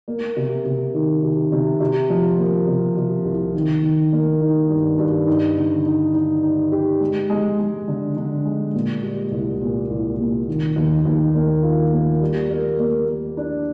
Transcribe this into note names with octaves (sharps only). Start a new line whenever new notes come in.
A#3
C3
C3
D#3
C3
C3
C3
F3
A#3
C3
C3
C2
D#3
D#3
A#3
D#4
G2
G2
D#4
D3
D#4
D#4
D#4
G4
G#3
G#3
G#3
D3
D3
G#3
A#2
G3
C2
A#2
C2
A#2
D#3
D#2
D#2
A#3
F4
A#3
G3
A#3
A#3
A#3
D4